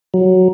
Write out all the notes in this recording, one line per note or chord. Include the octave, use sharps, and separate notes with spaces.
F#3